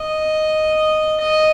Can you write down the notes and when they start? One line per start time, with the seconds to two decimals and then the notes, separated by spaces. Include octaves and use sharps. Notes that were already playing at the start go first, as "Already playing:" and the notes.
Already playing: D#5
1.20 D#5